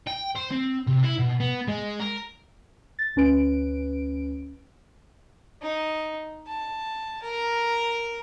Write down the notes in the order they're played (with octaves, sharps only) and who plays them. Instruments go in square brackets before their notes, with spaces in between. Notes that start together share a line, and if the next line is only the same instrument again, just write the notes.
[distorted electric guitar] G5
C5
C4
C3
E4
B2
B3
G#3
A#4
[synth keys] A6
D2 C#4 B4 D7
[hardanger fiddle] D#4
A5
A#4